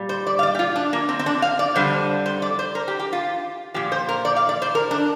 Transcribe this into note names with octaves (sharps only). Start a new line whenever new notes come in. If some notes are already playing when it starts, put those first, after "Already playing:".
Already playing: A#2 G3
C5
D5
F5
D5
G4
F4
D4
A#3
C4
C4
D4
F5
D5
F2 D3 G3 C5
C5
D5
C5
A#4
G4
G4
F4
A#2 F3 G4
C5
A#4
D5
F5
D5
C5
A#4
D4